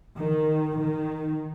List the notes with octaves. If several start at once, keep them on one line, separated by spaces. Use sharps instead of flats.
D#3
D#3